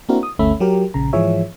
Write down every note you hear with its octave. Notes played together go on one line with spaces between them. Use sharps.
A#3 C4 D4 E4 F#4 A#4
D#6
G1 D2 A3 C#4 E5 B5
F#3 G4 A#4
A#1 C#3 A#5
G#2 E3 F3 G#4 C#5 E5